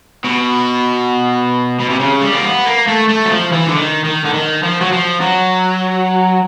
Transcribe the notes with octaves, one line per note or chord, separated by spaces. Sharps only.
B2
B2
C3
C#3
G3
A#3
B3
A#3
A3
A3
F#3
F3
E3
D3
D#3
D#3
D3
D#3
F3
F#3
F3
F#3